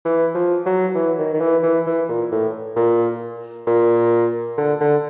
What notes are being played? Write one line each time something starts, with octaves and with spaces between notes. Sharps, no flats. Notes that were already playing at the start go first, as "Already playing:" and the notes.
E3
F3
F#3
E3
D#3
D#3
E3
E3
E3
A#2
A2
A#2
A#2
D3
D3